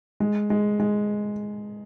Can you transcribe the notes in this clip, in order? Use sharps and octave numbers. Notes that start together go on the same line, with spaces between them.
G#3
G#3
G#3